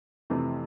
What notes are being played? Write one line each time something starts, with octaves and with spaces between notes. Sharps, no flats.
F2 C3 E3 A3